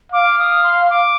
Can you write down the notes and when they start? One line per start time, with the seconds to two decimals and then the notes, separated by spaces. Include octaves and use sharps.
0.12 F5 D6
0.39 D#6
0.64 C6
0.90 D6